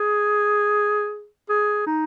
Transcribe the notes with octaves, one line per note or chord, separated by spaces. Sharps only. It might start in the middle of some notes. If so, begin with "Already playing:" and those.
Already playing: G#4
G#4
D#4